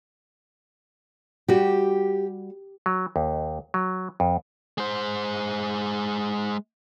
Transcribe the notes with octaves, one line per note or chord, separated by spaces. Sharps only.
G3 F#4 G4
F#3
D#2
F#3
F2
G#3 C5